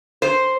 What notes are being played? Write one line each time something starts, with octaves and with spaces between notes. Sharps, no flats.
C5